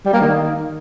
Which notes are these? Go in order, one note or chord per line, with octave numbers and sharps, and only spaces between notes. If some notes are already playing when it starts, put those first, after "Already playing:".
G3
A#3
D#3